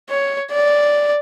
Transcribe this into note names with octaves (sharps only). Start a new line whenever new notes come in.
C#5
D5